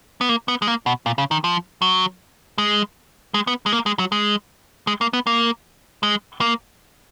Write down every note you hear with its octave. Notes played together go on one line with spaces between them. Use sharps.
B3
A#3
B3
G#3
A#3
B2
A#2
C#3
D#3
F3
F#3
G#3
G#3
B3
G#3
A#3
G#3
F#3
G#3
G#3
A#3
B3
A#3
G#3
A#3